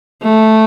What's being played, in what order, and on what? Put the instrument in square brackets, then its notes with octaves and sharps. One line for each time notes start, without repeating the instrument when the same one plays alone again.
[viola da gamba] A3